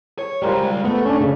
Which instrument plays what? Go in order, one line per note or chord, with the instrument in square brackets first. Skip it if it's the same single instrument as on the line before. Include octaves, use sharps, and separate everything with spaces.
[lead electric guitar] C#5
[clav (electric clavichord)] G3 A#4 C5 [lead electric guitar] G#3 F4
[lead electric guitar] A3 [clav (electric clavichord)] B3
[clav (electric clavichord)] C#4 D4
C#3